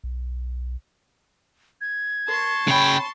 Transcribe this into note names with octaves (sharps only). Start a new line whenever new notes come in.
B1
G#6
A#4 C5 A5 C6 C#6
C#3 C5 C#5 G5 B5